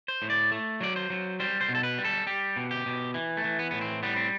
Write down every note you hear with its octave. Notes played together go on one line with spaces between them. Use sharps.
C5
A2
D5
A3
F#3 D5
C5
F#3
G3 C5
C5
B2
A4
B4
G3
A4
G3 G4
B2
G4
B2
E3
A3
E3
B3
A2 B3
C4
G3 B3
C4